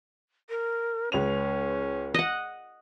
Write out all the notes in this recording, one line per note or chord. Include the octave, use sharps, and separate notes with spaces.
A#4
C#2 C#4 B4 F7
D#5 F#5